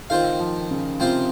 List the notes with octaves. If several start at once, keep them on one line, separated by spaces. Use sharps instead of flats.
D#3 C4 F4 C5 F5
F3
C#3
C3 C4 F4 C5 F5